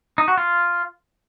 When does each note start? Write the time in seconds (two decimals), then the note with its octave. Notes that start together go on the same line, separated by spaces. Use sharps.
0.18 D#4
0.28 F#4
0.38 F4